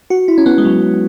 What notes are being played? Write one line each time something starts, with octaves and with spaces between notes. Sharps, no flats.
F#4
E4
C#4
B3
G#3
F#3